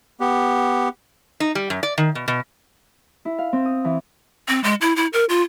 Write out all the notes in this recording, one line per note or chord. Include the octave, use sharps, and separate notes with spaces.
B3 G4
D#4
G3
F#2
D5
D#3
B2
B2
E4
F5
C4
D#6
E3
C4
G#3
E4
E4
A#4
F4